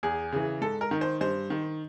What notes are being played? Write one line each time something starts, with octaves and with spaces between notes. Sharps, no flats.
E2 G#4
C#3 E3
G#2 A4
A#4
D#3
C5
G2 C5
D#3